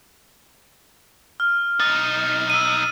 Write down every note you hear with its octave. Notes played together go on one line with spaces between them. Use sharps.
F6
B1 D#4 A6
E6 D#7